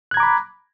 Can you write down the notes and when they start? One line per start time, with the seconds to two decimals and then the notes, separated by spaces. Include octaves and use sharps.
0.11 F#6
0.14 G#6
0.17 A#5
0.20 D6
0.23 B5